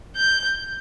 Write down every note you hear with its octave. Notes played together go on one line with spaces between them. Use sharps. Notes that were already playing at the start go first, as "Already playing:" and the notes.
G6